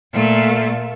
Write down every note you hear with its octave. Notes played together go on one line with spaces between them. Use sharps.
A#2 A3